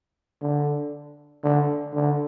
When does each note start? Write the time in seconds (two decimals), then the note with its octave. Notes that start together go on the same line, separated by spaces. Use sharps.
0.42 D3
1.43 D3
1.94 D3